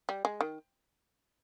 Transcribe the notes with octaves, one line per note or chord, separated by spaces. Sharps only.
G3
G#3
D#3